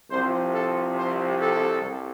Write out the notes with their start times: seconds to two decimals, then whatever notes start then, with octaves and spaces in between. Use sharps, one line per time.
0.11 C2 C3 F3 C5
0.54 A4
0.97 C5
1.40 A4
1.82 C2